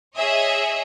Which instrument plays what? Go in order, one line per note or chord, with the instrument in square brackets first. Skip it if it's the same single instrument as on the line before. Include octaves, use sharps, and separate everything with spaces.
[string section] G#4 C#5 D#5 E5